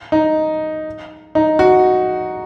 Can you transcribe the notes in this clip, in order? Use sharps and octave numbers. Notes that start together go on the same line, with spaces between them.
D#4
D#4
F#4